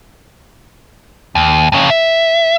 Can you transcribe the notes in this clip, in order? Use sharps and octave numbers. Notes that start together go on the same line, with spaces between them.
D#2
F2 C#3
E5